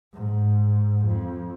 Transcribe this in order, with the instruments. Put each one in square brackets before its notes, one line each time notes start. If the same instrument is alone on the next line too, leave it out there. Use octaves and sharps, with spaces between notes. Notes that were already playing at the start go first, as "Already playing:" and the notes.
[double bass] G#2
F2